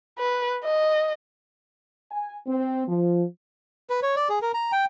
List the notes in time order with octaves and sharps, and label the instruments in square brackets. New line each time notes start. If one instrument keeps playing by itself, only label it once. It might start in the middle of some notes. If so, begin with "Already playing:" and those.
[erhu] B4
D#5
[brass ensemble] G#5
C4
F3
[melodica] B4
C#5
D5
G#4
A#4
A#5
G5